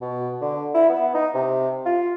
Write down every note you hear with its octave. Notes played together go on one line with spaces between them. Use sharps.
B2
D3
E4
B3
D#4
C3
F4